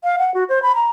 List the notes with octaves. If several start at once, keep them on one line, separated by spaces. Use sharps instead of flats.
F5
F#5
F#4
C5
B5
A#5